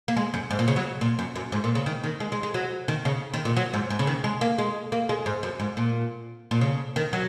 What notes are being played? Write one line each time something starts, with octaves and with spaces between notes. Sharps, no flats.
A#3
G#3
F#2
G#2
A#2
C#3
F#3
A#2
F#2
F#2
G#2
A#2
C#3
D#3
D#3
G#3
G#3
G#3
F#3
D#3
C#3
D#3
A#2
F#3
G#2
G#2
C#3
D#3
G#3
A#3
G#3
A#3
G#3
G#2
F#2
G#2
A#2
A#2
C#3
D#3
F#3